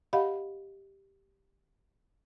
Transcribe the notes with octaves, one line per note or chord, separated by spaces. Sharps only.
G4 D#5 F5 F#5 B5